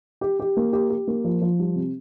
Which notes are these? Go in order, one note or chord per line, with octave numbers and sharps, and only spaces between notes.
G4
G4
A#3
G4
G4
A#3
F3
F3
G3
C3